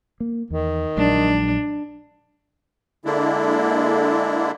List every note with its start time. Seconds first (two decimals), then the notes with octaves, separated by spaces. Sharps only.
0.20 A#3
0.50 E2 D#3
0.97 A#1 F#3 G#3 D4
3.05 D3 G#3 A#3 D4 E4